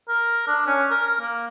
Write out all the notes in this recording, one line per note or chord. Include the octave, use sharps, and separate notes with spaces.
A#4
D4
C#4
A#4
A#3